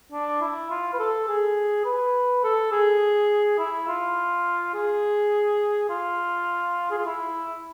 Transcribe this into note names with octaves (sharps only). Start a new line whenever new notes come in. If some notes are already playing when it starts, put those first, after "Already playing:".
D4
E4
F4
B4
A4
G#4
B4
A4
G#4
E4
F4
G#4
F4
G#4
F4
E4